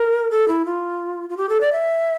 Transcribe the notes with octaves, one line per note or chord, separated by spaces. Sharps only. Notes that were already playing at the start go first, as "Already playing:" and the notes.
Already playing: A#4
A4
E4
F4
F4
G4
A4
D5
E5